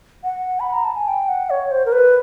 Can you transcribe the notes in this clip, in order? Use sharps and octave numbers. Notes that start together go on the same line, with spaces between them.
F#5
B5
A#5
A5
G#5
G5
F#5
C#5
C5
A#4
B4